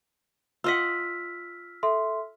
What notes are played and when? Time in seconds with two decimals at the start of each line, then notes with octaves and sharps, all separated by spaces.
0.64 F4 D#5 F#5 E6 F6 B6
1.83 A4 E5 C6